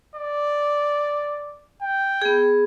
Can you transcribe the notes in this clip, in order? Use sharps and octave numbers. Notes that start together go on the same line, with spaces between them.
D5
G5
B3 G#4